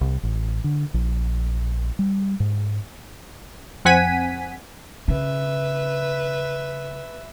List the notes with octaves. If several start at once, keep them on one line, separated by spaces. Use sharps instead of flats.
C2
A1
D3
A#1
G3
G#2
F2 C4 F#5 G#5 B6 D#7
C#3 B4 E5